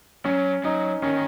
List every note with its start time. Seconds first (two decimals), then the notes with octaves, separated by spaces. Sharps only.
0.25 F#3 C#4
0.64 F#3 D#4
1.02 D#3 C#4